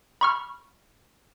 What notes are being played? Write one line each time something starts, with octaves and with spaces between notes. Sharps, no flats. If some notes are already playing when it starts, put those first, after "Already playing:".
B5 C#6 F6